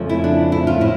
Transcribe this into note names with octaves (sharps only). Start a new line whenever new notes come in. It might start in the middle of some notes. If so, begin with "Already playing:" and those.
Already playing: F2 C#3 F3 A3
E4
D4
E4
F4
A2 E4